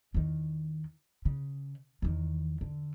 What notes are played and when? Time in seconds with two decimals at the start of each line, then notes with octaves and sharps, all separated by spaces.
0.14 E2 D#3
1.25 C#3
2.02 E2 D#3
2.61 D3